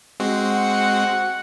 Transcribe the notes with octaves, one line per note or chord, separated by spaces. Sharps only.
G#3 C4 F#4
F#5